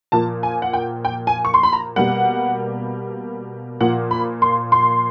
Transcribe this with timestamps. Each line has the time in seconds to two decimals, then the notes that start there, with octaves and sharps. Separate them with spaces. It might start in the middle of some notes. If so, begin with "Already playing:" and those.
0.12 A#2 F3 A#3 A5
0.43 G#5
0.62 F#5
0.73 G5
1.05 G5
1.27 G#5
1.45 C#6
1.54 C6
1.63 B5
1.73 A#5
1.96 B2 G3 A#3 F#5
3.80 A#2 F3 A#3 F#5
4.11 B5
4.42 C6
4.72 C6